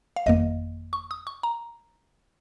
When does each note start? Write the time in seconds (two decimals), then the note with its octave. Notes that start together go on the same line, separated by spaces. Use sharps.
0.16 F5
0.26 G1 F2 D#3 A#3 D#5
0.93 C#6
1.11 D#6
1.27 C#6
1.43 A#5